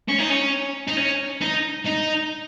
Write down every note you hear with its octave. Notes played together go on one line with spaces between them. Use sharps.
C#4
D#4
C#4
D#4
C#4
D#4
D#4